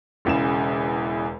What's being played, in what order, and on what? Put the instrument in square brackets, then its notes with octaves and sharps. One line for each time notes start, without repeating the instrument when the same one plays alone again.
[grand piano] E1 E2 C#3 E7